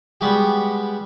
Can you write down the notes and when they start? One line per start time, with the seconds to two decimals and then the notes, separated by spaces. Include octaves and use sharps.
0.21 G3 G#3 B3 F#4 G4